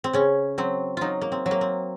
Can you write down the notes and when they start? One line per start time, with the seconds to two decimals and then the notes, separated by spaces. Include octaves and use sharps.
0.04 C4
0.13 C#3 C#4
0.58 F#3 C4
0.97 F#3 D#4 F4
1.21 A#3
1.32 C4
1.46 F#3
1.51 A#3
1.61 C4